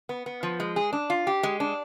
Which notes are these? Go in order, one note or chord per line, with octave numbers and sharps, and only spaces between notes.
B3
B3
F3
G#3
G#4
D4
F4
G4
G#3
D4